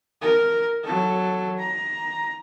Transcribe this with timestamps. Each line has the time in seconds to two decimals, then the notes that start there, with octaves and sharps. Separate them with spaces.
0.22 A#4
0.84 F#3 A4
1.59 A#5